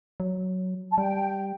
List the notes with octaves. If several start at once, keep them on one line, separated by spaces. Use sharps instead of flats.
F#3
A5
G3 G5